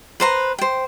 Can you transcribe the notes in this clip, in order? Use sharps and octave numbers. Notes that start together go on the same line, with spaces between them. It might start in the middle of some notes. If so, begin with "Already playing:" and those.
B4 C5 A#5
C5 G5